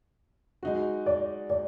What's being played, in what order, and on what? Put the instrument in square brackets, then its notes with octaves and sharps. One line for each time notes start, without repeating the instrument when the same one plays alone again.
[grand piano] G#3 D#4 F#4
[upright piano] D5
D5